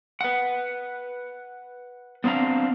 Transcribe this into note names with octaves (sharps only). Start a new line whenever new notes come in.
B4 F#5
B3 C4 D4 F5 A#5